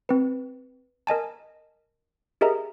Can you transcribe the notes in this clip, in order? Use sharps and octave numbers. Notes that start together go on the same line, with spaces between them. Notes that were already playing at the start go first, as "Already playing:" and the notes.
C4 B4
A#4 D#5 G#5 A5
G4 G#4 A#4 D#5 E5 A#5